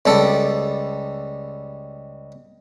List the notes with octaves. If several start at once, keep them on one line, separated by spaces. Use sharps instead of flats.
C#2 G3 A4